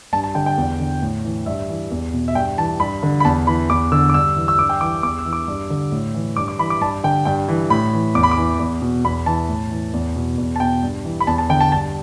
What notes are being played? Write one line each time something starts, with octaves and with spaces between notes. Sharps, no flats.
G2 A5
A5
D3 G5
G5
E2
D3
A2
E3
G2 E5
E3
E2
B2
E5
G2 G5
E3 A5
G2 B5
D3
B5
E2 A5
E3 B5
E2 D6
D3 E6
D6
G2 E6
E3
E6
G2 D6
G5
E3 D6
E2 D6
E6
E3
D6
G2
D3
A2
E3
G2 D6
D6
E3 B5
D6
G2 A5
D3 G5
G2 G5
E3
A2 B5
E3
E2 D6
B5
D6
E3
E2
B2
E2 B5
E3 A5
A2
E3
E2
B2
E2
A5
B2 G5
G2
E3
B5
E2 A5
A5
D3 G5
A5
G2 A5